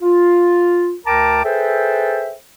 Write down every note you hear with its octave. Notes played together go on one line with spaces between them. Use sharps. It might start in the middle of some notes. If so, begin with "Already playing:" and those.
F4
D2 A#4 G5 A5 A#5 D6
G#4 A4 B4 C5 E5 G5